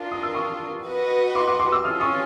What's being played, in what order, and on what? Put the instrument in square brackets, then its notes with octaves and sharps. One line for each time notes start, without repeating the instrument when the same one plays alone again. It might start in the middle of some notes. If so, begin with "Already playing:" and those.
Already playing: [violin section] D4 F4 A#4
[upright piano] D#6
E6
C#6 D#6
[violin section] F#4 B4 D#5 F#5
[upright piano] C6 D6
C6 D6
C6 D6
D6 E6
[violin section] C#4 F4 A4 [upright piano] D#6 F6
[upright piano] C#6 D#6